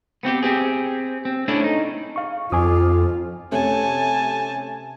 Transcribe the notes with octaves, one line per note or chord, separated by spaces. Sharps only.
B3 C4 F#4 G4
C4 G4 G#4
C4
A3 C#4 D4 E4
D#4
F5 C#6
F2 F4 G#5 D6 D#6
C3 A3 C#4 G#5 A5